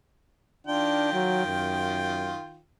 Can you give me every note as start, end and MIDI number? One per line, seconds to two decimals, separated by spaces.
0.67 2.59 51
0.67 1.08 62
0.67 2.59 65
0.67 2.59 79
1.13 1.42 54
1.47 2.36 42